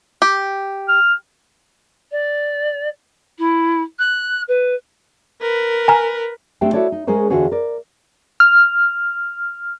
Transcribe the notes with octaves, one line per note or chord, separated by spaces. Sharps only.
G4
F6
D5
E4
F#6
B4
A#4 B4
G#5 A#5 F6
A3 C4 D4 G4 G5
E4 F#4 A4 C#5 D5
D#4
G#3 C#4 G#4 A#4 C5 C#5
E2 D3 F4 F#4 G#4 C#5
A#4 D5
F6